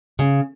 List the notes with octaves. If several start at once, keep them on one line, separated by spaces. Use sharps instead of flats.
C#3